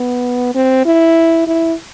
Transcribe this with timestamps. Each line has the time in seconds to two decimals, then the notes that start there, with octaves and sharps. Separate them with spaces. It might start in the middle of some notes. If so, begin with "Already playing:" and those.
Already playing: B3
0.55 C4
0.85 E4
1.47 E4